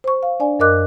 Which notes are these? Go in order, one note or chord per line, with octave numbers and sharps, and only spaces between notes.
C5 C#6
F5
D4 D5 G#5
F#2 A#4 D#5 D6 F#6